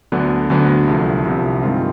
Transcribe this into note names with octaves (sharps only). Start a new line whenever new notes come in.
D2 D3 F#3 B3 D4
D2 D3 F#3 B3 D4
C2 C3 F3
C2 C3 F3
G2 D#3 G#3 C4 F4